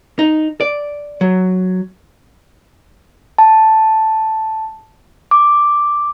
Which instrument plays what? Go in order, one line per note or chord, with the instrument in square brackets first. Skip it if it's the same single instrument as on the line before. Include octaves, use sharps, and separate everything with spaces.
[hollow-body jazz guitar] D#4
D5
F#3
[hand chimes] A5
D6